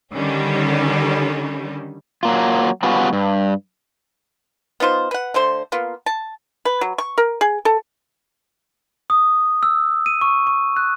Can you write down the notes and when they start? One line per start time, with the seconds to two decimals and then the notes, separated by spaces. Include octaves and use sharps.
0.13 D3 D#3 G3 C#4
2.23 F#3 A#3 F4
2.83 G3 B3 C#4 F4 F#4
3.13 G2
4.80 B3 D#4 F4 C5
5.11 B4 F#5
5.34 D3 A3 C5 C6
5.72 A#3 B3 F4
6.06 A5
6.65 B4
6.81 F#3
6.98 C#6
7.18 A#4
7.41 G#4
7.65 A4
9.10 D#6
9.63 E6
10.06 D#7
10.21 C#6
10.47 C#6
10.77 F#6